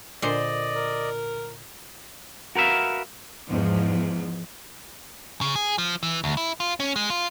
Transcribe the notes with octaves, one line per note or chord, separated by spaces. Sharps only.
A#2 D3 C5 D5 D#5
A#4
F#4 A#4 B4 E5 F5
E2 G#2 F3
C#3
G#4
F3
E3
D2
E4
F4
C#4
G#3
F4